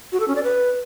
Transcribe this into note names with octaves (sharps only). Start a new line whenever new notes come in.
F#4
A4
C#4
D5
B4